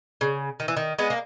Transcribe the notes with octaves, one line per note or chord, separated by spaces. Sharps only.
C#3
D#3
E3
D#3
G#3 B3
A#3